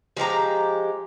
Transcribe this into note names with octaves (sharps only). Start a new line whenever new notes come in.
F3 G#3 G4 A#5